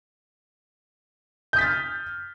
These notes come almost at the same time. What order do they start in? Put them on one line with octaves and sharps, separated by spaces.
G6 D#6 B6 A6 F6